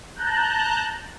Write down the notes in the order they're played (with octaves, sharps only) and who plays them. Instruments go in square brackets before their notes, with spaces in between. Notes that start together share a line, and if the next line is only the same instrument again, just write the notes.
[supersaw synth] A5 A#5 F#6 G6